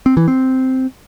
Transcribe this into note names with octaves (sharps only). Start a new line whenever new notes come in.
C4
E3
C4